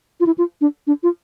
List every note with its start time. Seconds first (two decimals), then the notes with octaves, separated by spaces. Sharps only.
0.20 F4
0.26 E4
0.38 F4
0.61 D4
0.87 D4
1.03 F4